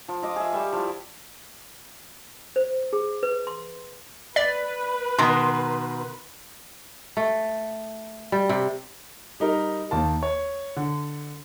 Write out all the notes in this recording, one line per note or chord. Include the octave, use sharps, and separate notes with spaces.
F3
F4 D#5 D6
G#4 E5
G3 F5 C#6
F3 E4
C5
G#4
B4
C6
B4 D5 B6
B2 D#3 A#5 C6
A3
G3
C3
G3 D#4 A#4
D#2 D#3 A#3 A5
C#5
D3